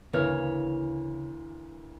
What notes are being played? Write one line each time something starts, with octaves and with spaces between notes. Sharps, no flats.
D2 C#3 E3 A#3 C#5 F6